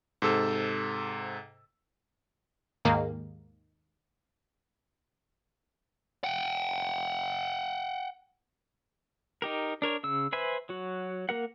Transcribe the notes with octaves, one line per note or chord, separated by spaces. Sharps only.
G#2 C3 A4 E6
D#2 G#2 D#3 A#3
F#5 G5
D#4 G4 A#4
D4 A#4 C#5
C#3 E6
B4 C5 E5 G#5 B5
F#3 F#4
A#3 A#4 F#5